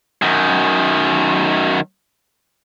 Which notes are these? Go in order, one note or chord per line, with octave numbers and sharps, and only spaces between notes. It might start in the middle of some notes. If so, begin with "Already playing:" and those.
F#2 D#3